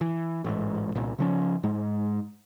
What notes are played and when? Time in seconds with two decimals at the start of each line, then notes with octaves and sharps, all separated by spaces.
0.01 E3
0.44 A1 G#2
0.95 C2 A#2
1.18 C#3 F3 C#4
1.63 G#2 G#3